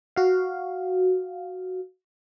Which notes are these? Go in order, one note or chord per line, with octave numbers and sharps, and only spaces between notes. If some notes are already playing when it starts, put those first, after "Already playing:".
F#4 F5